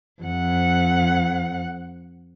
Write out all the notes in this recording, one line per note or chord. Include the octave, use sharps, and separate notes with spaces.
F2 F#5